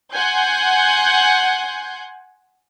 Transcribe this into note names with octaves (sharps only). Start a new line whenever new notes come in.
F#5 G#5 C6 G6